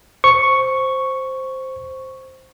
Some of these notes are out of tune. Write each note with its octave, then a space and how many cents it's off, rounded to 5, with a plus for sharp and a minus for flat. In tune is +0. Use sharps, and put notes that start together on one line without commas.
C5 +0 C#6 +0